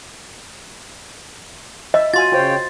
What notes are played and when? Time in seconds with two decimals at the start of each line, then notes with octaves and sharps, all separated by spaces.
1.94 D#5 E5
2.14 F4 F#4 G#5 C6 A6
2.32 C#3 F4 C5 C#5 G5